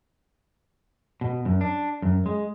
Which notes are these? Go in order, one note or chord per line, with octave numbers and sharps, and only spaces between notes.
B2
F#2
D4
F#2
G#3